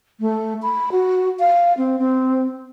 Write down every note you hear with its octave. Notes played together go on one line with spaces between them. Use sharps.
A3
B5
F#4
F5
C4
C4